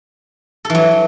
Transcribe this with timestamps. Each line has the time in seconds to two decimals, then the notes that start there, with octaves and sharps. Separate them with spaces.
0.65 A4
0.70 E3
0.75 F#3